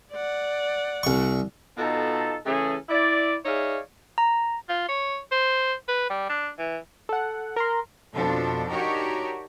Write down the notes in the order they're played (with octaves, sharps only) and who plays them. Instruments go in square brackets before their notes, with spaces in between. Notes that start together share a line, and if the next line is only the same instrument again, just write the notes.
[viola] D5 F#5
[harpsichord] C2 C#6
[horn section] B2 D#4 F4 A4
C#3 E3 A3 C#4 G#4 A4
E4 D5
D#4 G#4 C#5 D5 E5 F5
[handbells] A#5
[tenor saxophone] F4
C#5
C5
B4
G3
D4
E3
[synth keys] A4 F#5
A#4 A#5 C6
[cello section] F2 B2 F3 D4 A4
D4 D#4 F#4 G4 A#4 C#5